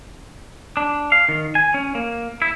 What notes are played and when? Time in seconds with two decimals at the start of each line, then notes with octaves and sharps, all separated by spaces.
0.77 D4
1.12 F5
1.29 D#3
1.55 G#5
1.74 C#4
1.95 A#3
2.42 E4